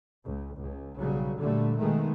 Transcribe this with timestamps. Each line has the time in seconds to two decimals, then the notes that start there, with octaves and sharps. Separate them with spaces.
0.23 C#2
0.57 C#2
0.98 B1 C#3 F#3 G3
1.39 A#2 D3 G3 A3
1.77 B2 D#3 G#3 A3